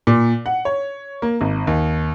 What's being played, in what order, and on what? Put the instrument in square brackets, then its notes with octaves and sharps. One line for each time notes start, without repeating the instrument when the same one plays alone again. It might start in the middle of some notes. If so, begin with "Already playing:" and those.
[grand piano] A#2
F#5
C#5
A#3
G#1
D#2